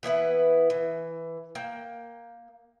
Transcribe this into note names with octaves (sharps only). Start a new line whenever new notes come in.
E3 B3 E4 B4
E3
A#3 G5